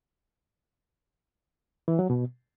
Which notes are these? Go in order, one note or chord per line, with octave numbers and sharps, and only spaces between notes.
E3
F#3
B2